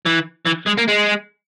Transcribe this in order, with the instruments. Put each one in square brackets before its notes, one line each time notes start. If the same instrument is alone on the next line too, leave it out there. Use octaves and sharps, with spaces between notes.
[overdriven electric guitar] E3
E3
G#3
A#3
G#3